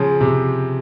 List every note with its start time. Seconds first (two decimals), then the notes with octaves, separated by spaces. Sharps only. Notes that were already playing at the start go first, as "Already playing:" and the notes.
Already playing: C#3 F3
0.21 C3